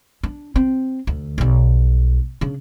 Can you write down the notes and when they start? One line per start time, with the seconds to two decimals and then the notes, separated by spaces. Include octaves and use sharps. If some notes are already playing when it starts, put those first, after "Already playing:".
0.24 D4
0.56 C4
1.07 D2
1.38 B1 G3
2.41 C#3 D4